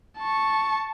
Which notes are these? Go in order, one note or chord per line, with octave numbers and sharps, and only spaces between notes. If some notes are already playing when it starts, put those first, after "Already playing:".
A5 C#6